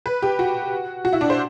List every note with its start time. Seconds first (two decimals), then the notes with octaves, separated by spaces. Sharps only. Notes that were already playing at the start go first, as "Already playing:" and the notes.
0.06 B4
0.22 G4
0.39 F#4
1.05 F#4
1.13 E4
1.21 D4
1.30 C5